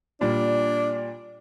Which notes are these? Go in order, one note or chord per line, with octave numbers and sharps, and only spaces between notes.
A#2 G3 D4